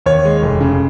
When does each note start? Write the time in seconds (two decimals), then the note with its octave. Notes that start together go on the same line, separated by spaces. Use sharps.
0.06 D#2 C#5
0.25 G#3
0.42 F1
0.61 C#3